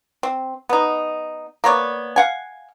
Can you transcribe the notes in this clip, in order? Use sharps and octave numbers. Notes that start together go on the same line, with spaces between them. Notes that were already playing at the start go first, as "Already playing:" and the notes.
C4
B3 D#4
A#3 B3 C#5 D5
F5 F#5 G#5